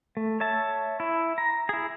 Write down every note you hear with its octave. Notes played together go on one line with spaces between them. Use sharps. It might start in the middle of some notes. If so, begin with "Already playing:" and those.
A3
C#5 E5 A5
E4
A#5
E4 G#4